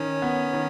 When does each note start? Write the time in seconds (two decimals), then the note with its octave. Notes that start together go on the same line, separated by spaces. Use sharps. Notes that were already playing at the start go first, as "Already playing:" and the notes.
Already playing: D#3 C#4 C#5
0.22 B3
0.53 D#3